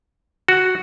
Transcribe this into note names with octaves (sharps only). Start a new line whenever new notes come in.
F#4